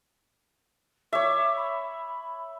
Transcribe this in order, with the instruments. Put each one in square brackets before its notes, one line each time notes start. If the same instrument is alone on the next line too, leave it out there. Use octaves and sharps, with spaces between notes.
[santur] C#5 E5 [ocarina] D6
[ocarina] B5